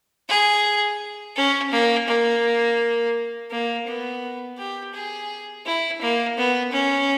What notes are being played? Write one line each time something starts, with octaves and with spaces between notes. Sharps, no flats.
G#4
C#4
A#3
A#3
A#3
B3
G4
G#4
E4
A#3
B3
C#4